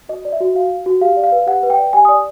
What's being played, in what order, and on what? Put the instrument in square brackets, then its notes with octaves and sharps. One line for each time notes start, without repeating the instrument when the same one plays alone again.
[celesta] F#4 D#5
D5
E5
F#4
F#4 F5
F#4
F#4
G4 F5
D5
F5
B4
G4 F#5
B4
G5
D5
G4 G#5
D5 D#6